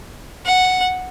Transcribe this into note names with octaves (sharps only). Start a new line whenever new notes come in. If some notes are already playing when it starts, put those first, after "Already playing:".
F#5